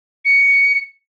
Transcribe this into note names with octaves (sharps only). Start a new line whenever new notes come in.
C#7